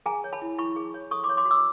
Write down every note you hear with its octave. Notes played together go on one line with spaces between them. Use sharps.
G#4 G#5 A#5
C#5
A5 B5
E4
E4 B5 C#6
G#4
C#5
A4 C#6 D#6
C6 D6
C#5
C6 D6
F#4
D6 E6